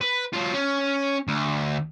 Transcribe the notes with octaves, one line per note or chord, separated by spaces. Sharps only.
B4
F#3 F4
C#4
D2